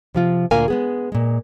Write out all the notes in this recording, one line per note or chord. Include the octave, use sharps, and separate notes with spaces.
C3 F3 F4
D2 A#2 A#3 A#4 F5 G#5
G#3 B3 G#4
A#2 G#3